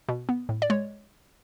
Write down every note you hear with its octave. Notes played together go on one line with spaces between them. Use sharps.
B2
B3
A2
D5
G#3 C#5